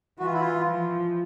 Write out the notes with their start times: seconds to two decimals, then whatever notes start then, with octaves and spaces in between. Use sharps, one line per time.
0.19 E3 F#4
0.26 F4
0.33 E4
0.40 F4
0.66 F3